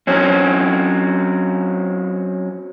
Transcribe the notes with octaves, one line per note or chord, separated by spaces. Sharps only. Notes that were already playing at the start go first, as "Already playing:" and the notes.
F#3 C4 C#4